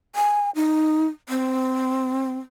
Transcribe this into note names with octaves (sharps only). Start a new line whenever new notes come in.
G#5
D#4
C4